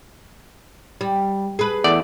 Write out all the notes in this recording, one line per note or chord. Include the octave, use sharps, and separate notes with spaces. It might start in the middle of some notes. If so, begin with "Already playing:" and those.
G3
G#4 B4
E2 A3 D5